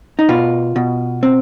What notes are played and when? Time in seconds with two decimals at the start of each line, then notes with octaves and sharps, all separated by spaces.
0.19 D#4
0.29 B2 F4
0.76 B2
1.23 C4